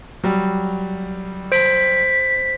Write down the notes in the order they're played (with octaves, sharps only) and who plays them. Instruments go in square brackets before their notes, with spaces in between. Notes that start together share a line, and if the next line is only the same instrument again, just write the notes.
[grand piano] F#3 G3
[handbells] C5 D7 [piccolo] B6